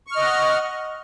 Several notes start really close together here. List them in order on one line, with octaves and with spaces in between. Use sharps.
C#6 F6 D#5 F#5